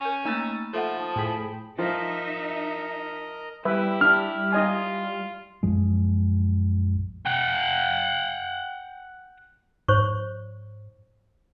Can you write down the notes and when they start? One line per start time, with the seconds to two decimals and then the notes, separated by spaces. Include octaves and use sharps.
0.01 C#4 A#4 G#5
0.25 A3 A#3 D#4 A#5 B5 E6 A6
0.73 F3 A4 E5 F#5
0.97 A5 D#6
1.16 A2 G#4 G5 B5
1.79 F3 D#4 A#4 D#5 E5 A#5
3.65 G3 E4 G4 B4 E5
4.01 D4 F6
4.52 D#4 F4 D#5 G#5
5.63 A#1 F#2 F3 G#3
7.26 F#5 G5
9.88 G#2 C5 C#5 C#6